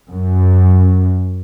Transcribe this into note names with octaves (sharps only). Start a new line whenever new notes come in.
F#2